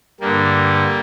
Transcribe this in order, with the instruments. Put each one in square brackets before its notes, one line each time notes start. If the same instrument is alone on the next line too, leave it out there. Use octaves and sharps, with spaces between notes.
[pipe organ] G2 D3 G3 A#3